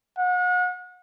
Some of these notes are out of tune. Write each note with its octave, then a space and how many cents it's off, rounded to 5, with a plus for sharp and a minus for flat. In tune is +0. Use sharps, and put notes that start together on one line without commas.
F#5 -35